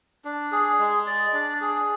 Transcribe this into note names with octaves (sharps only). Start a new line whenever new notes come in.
D4
G#4
G#3
D5
D4
G#4